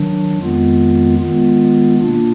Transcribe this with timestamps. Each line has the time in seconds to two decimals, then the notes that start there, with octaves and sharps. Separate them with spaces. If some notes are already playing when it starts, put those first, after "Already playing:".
Already playing: D#3 F#3 D4
0.39 F2 D#3 G#3 B3 F4
1.19 D#3 G#3 B3 F4
1.99 B2 A#3 D4 F4